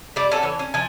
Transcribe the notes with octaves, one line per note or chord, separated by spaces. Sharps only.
G3 D5
C#4 A4 F#5
E3 C#5
C#4
F3 G#5